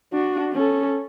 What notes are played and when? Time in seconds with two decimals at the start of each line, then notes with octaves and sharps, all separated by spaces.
0.13 D4 F#4
0.53 C#4 A4